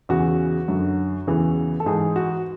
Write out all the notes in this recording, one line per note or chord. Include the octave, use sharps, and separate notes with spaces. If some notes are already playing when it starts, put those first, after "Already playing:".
E2 C#3 E3 F#4
F#2 D3
E2 C#3 E3
A4
G#2 E3 G#4
F#4